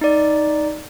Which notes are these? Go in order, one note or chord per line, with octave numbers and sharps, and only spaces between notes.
D#4 D5